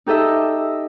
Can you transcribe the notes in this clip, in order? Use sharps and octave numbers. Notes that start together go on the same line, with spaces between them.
D#4 G4 A4 D#5 E5